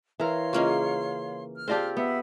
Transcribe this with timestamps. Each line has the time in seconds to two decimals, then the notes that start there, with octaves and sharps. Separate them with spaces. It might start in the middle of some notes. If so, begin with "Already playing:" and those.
0.20 E3 A#4 C#5 F5 C6
0.53 C#3 A#3 C#4 F4 D#5
1.55 F6
1.68 C4 F4 G4 G#4 D5 A5
1.97 B3 E5 F#5